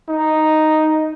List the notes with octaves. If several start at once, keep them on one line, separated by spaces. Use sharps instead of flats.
D#4